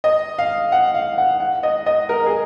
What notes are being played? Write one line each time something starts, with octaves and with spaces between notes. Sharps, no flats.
D#5
F5
F#5
F5
F#5
F#5
D#5
D#5
A#4
G#4